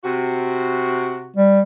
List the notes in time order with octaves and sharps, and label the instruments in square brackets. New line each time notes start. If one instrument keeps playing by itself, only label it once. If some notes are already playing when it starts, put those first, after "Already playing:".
[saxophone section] C3 F#4
[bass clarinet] G3